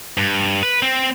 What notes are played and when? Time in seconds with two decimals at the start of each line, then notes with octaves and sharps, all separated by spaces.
0.18 G2
0.63 B4
0.82 C4